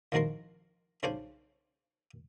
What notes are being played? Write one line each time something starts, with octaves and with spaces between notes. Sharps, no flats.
C2 D#3 F3 F#4 A#4 C6
B1 C#3 D4 C5 C#5 G#5